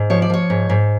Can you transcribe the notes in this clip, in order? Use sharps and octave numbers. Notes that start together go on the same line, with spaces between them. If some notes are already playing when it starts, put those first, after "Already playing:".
Already playing: G#2
F3 C#5
D5
F3 C#5
G#2
G#2